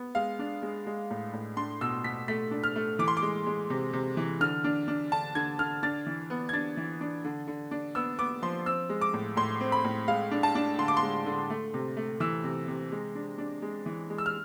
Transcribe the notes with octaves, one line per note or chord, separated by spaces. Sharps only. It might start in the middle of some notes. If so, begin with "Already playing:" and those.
Already playing: B3
G#3 F5
D4
G#3
G#3
A2
A2
D4 C6
B2 E6
B2 B6
A3 B6
D4
F6
A3
E3 D6
C6
D6
G#3
G#3
C3
C3
E3
D3 F6
D4
D4
D3 A5
D3 G#6
D3 F6
D4 A6
E3
B3
G#6
D4 A6
E3
D4
D3
D3
D4
B3 E6
B3 D6
F3 C6
C4 E6
G#3
D6
A2
A2 C6
C4
B5
A2
G#3 F5
D4
A5
D4
D3 C6
D6
C6
G#3
D3
A3
C3
A3
E3 E6
C3
C3
G#3
D4
D4
G#3
E3
G#3
E6
F6